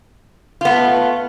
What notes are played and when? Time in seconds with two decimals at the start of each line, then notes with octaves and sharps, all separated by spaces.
0.61 F4
0.65 B3
0.69 A3